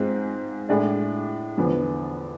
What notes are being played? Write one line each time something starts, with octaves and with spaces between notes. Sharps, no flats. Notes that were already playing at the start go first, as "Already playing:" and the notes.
Already playing: G#2 G#3 C4 F4
A2 G#3 D4 G#4 D5
E2 D3 F3 B3